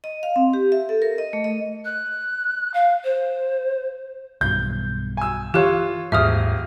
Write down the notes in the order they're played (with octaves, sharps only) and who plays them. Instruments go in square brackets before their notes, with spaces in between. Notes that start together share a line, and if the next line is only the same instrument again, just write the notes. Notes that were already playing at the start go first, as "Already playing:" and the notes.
[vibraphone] D#5
F5
C4
G4
E5
A4
A#4
D#5
A3
D#5
[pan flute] F#6
F5
C5
[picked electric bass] B1 G2 B2 [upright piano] G6
[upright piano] G#5 E6
[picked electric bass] E3 [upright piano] F4 C#5 [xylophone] G4 F#6
[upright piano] D#1 G#4 F6 [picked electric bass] D#2 G#2 [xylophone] E5 D#6